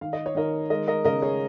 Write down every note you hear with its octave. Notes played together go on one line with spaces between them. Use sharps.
D#3 F5
D#5
C#5
D#3 A#4 D#5
G#3 A#4 D#5
A#4 D#5
C#3 A#4 D#5
G#4 C#5